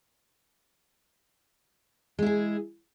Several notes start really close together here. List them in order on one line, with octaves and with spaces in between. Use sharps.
G#3 E4 G#4